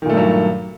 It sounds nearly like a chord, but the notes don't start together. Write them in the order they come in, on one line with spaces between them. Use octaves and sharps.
D#3 A#2 A3 G2 F#3